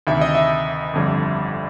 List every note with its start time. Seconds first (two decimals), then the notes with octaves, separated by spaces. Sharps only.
0.07 D2 C3 D#3 E5
0.21 D#5
0.35 E5
0.93 G1 F2 D3 G3